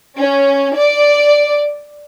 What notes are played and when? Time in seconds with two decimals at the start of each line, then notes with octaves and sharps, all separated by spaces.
0.18 C#4
0.75 D5